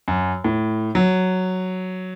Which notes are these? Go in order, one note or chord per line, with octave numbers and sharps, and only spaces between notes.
F#2
A2
F#3